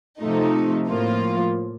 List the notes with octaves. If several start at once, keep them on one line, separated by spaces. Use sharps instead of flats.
C3 F3 A3 D#4
A2 F3 A#3 F4